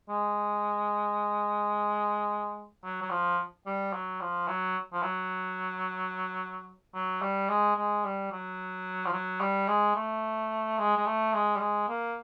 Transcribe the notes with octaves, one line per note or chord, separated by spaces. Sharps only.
G#3
F#3
F#3
F3
G3
F#3
F3
F#3
F3
F#3
F#3
G3
G#3
G#3
G3
F#3
F3
F#3
G3
G#3
A3
G#3
G#3
A3
G#3
G3
G#3
A#3